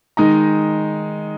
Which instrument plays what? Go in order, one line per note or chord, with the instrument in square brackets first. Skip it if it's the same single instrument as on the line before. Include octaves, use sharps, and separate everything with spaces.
[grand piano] D#3 G#3 D#4 A#5